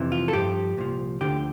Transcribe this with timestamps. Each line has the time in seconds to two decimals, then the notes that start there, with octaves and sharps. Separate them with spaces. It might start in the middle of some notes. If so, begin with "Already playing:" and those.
Already playing: F2 C3 E3
0.12 F4
0.28 A4
0.33 G2 F3 G4
0.77 C2 A#2 F3
1.21 D2 D3 F3 G4